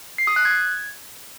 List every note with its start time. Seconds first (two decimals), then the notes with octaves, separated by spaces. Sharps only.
0.18 C7
0.27 D#6
0.36 F#6
0.45 G#6